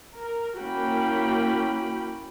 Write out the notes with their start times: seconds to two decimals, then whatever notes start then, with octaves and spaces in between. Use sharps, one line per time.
0.18 A#4
0.60 A#3 C#4 E4 F#4 G5 B5